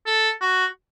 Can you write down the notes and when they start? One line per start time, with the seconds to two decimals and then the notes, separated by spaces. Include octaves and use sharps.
0.07 A4
0.41 F#4